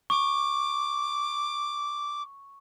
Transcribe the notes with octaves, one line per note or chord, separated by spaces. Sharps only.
C#6 D6